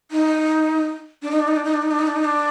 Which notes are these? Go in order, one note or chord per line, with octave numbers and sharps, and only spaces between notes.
D#4
D4
D#4
D4
D#4
D4
D#4
D4
D#4
D4
D#4
D4
D#4
D4